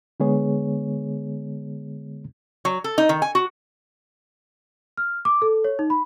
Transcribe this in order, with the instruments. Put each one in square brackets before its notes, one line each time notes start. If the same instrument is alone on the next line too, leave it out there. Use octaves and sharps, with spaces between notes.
[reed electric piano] D3 G#3 B3 G#4 C#5
[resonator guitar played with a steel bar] F#3
A4
D#4
D#3
G#5
F#4
[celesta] F6
D6
A4
C#5
D#4
B5